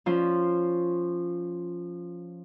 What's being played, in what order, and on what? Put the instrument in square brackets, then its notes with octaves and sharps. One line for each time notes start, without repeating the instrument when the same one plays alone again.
[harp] F3 C#4 F4